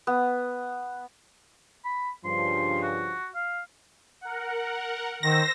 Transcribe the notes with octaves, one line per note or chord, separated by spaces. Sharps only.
B3
B5
G2 C#3 F3 C6
F#4
F5
A#4 F#5
D#3 C5 E6 A#6